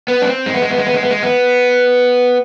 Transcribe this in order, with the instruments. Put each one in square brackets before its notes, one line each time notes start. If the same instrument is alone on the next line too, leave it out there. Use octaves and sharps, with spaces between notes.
[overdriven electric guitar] B3
D4
C4
G#3
B3
G#3
B3
G#3
B3
G#3
B3
G#3
B3